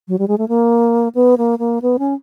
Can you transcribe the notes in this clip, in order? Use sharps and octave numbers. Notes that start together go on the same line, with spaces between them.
F#3
G3
G#3
A3
A#3
B3
A#3
A#3
B3
C#4